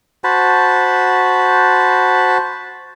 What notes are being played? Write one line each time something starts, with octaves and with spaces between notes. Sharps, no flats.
F#4 C5 A5 B5